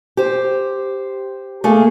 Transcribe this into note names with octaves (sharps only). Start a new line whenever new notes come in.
G4 C5
A3 A#3 G#4